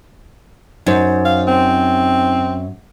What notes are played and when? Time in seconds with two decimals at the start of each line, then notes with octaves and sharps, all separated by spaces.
0.86 F#2 D#4 C5
1.25 F5
1.47 C4